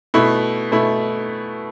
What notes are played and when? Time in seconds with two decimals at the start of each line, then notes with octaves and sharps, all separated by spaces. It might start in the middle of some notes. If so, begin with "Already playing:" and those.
0.14 B2 A3 E4
0.72 B2 A3 E4